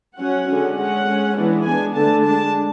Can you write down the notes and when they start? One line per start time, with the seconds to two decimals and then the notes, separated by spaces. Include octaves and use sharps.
0.17 F#3 C#4 F#5
0.47 D3 G#3 C#4
0.76 G#3 C#4 F#5
1.06 G#3 C#4
1.35 E3 G#3 B3 D4
1.65 G#3 B3 D4 G#5
1.95 D3 A3 D4 A5
2.24 G#3 D4 A5